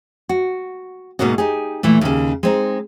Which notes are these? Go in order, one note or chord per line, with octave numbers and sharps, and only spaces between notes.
F#4
G#2 B2 A#3 F#4 D#5
D#4 G4 G#4
A#2 E3 A3
D#2 C#3
G#3 C4 D#4